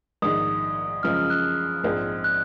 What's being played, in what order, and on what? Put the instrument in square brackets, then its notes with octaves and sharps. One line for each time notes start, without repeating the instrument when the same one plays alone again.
[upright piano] A#1 G#2 D#3 [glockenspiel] D#6
[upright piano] F#2 C#3 F3 G#3 [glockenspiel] F6
[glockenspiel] F6
F#6
[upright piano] A#1 G#2 F3 G#3 C4
[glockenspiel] F#6